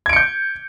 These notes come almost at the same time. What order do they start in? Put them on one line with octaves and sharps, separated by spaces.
G#6 D7 C#7 G6